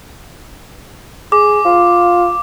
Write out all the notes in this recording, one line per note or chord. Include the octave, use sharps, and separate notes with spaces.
G#4 D6
F4